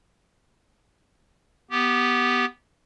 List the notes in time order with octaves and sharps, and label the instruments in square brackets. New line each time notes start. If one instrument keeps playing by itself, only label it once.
[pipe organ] B3 G4